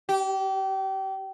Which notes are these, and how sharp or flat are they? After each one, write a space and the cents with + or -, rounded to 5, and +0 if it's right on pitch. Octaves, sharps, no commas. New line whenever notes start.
G4 -30